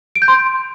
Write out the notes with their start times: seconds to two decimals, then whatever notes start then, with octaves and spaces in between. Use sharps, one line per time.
0.16 D7
0.22 G6
0.28 C6